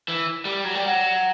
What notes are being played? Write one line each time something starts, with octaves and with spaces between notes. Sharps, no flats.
E3
G3
F#3
G3
F#3